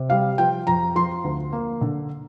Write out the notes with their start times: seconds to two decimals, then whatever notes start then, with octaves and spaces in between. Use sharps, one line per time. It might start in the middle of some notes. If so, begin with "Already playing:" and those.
Already playing: C3
0.10 G3 F5
0.38 F3 G5
0.67 F2 A#5
0.95 F3 C6
1.24 D2
1.52 A#3
1.81 D3